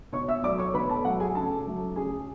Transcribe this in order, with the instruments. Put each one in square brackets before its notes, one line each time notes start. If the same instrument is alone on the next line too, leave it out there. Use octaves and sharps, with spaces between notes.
[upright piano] B2 C#5 C#6
E5 E6
F#3 A3 D5 D6
C#5 C#6
B2 B4 B5
A4 A5
F#3 A3 F#5
G#4 G#5
C#3 A4 A5
F#3 A3
C#3 G#4 G#5